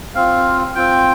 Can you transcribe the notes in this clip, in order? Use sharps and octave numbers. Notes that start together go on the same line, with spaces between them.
C4 F4 F5
C4 F4 G5